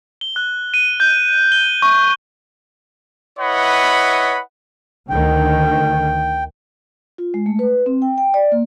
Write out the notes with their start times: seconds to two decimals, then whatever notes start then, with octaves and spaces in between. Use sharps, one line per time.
0.21 G7
0.36 F#6
0.74 D#7
1.00 G6
1.52 G7
1.82 C#6
3.39 E4 B4 C#5 D#5 F#5 B5
5.10 D2 D3 D#3 G5
7.18 F4
7.34 G#3
7.46 A3
7.59 B4
7.86 C4
8.02 G5
8.18 G5
8.34 D5
8.52 A#3